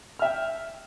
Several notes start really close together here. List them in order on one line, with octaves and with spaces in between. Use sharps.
F6 E5 G5